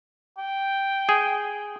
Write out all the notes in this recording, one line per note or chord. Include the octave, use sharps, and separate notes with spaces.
G5
G#4